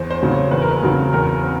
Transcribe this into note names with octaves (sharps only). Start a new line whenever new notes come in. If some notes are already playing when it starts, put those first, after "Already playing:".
Already playing: E2 C5
C5
C#3 F#3 A3 C4
C#5
E2 B4
A#4
B4
C#3 F#3 A3 C4
E2 A#4
C4